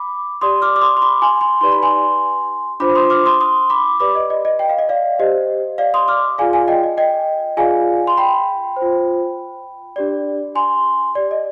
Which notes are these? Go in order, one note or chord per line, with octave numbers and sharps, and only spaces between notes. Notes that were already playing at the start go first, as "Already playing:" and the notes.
Already playing: B5 D6
G4 D5 C6 D#6
D6 F6
D6
C6 D#6
C6
B5 D6
G#5 C6
G#5 C6
D#4 G4 B4 D5 C6
B5
G#5 C6
D4 F4 C5 B5 D6
C6 D#6
D6 F6
C6 D#6
C6 D#6
B5 D6
G4 B4 D5 B5 D6
D#5
D#5
D#5
G5
F5
D#5
D5 F5
G4 C5 D#5
D5 F5
C6 D#6
D6 F6
F4 G#4 D5 F5 G#5
F5 G#5
D#5 G5
D#5
D#5 G5
F4 G#4 D5 F5 G#5
C6
G5 B5
C5
F4
D4 G4 D5
G#5 C6
G4 D5
D#5